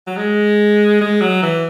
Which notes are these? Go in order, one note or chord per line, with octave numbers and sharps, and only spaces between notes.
F#3
G#3
G#3
F#3
E3